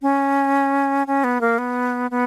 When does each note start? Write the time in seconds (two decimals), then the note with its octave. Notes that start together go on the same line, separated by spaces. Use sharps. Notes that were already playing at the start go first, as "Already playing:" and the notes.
0.02 C#4
1.07 C#4
1.24 B3
1.41 A#3
1.58 B3
2.11 B3